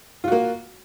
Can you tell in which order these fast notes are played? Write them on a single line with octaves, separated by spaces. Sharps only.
F4 F#4 A#3